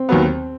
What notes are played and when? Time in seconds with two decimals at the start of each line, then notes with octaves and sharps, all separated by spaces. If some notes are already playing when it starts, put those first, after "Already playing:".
Already playing: C4
0.09 D#2 D#3 F#3 B3